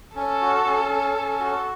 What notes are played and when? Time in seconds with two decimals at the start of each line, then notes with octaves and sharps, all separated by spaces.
0.16 C#4 A4
0.41 F#4
0.65 C#4
0.89 C#4
1.15 C#4
1.40 F#4